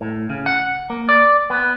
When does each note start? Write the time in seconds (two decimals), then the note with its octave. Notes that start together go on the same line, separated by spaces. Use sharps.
0.01 A2
0.30 C#3
0.46 F#5
0.90 A#3
1.09 D5
1.50 B3